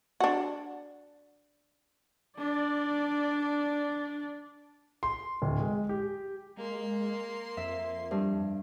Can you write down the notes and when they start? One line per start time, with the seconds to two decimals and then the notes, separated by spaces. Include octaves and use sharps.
0.20 D4 F#4
2.39 D4 D5
5.03 C6
5.42 D1
5.60 G#3
5.89 G4
6.57 G#3 A#3 C6
7.57 F2 E5
8.11 G2